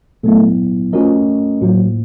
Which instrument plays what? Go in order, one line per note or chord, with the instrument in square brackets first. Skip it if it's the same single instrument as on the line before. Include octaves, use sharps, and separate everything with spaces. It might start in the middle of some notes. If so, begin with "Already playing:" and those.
[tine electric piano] A#2 F#3 B3 E4 [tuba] A3
[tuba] F3 [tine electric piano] A3 C#4 F#4 A#4 D#5
[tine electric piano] A2 F3 A#3 [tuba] F#3